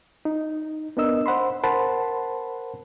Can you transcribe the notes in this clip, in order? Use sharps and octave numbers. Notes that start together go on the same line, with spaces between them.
D#4
B3 D4 A#4 D#5 E6
C5 F#5 B5 C6
A#4 C5 F#5 A5 B5 C6